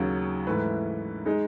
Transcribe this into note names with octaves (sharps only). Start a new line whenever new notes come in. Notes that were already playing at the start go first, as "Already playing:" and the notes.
Already playing: D#2 C#3 F#3
G#2 E3 A3 E4 B4
G#3 D#4 G#4 D#5